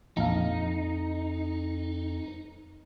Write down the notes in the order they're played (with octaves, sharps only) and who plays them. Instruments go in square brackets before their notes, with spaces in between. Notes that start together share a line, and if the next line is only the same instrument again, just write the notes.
[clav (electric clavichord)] A#1 F5 [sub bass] F2 [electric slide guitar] D#4